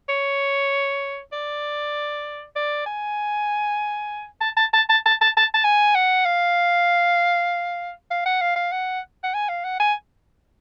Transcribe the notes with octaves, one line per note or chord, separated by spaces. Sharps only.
C#5
D5
D5
G#5
A5
A5
A5
A5
A5
A5
A5
A5
G#5
F#5
F5
F5
F#5
F5
F5
F#5
F#5
G#5
F5
F#5
G#5